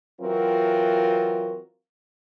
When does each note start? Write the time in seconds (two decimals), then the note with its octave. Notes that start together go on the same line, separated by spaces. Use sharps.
0.21 E3 F#3 C4 F4 F#4 A#4